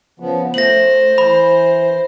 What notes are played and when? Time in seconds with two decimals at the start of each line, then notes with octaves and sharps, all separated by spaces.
0.20 C#3 F3 B3
0.54 A3 C5 A#6 F#7
1.18 E3 B5